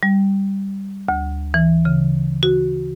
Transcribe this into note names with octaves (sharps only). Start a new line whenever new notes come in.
G3
D2
E3
C#3
F#4